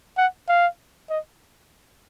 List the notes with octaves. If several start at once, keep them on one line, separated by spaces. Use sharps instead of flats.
F#5
F5
D#5